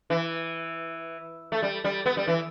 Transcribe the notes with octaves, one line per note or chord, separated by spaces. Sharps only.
E3
A3
G3
G3
B3
G3
E3